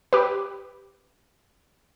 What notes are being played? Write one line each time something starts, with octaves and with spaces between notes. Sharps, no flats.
G4 B4